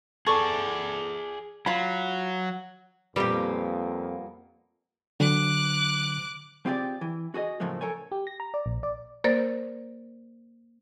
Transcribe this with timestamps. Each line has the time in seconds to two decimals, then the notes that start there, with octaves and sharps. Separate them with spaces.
0.27 G#4 A4 D5 C#6
1.66 F#3 F4 B5
3.16 F2 A#2 G3 A#3 B3 G4
5.20 D3 F#3 D6 F#6
6.66 C4 F4 G4 G#4 D5
7.01 E3
7.34 F#4 G#4 C5 D#5
7.60 A2 C#3 F3 F#3 A3 A#3
7.81 A4 A#4 C#5 G#5
8.12 G4
8.27 A#6
8.40 A#5
8.54 D5
8.66 A#1
8.83 D5
9.24 A#3 A#4 C5 D5 A6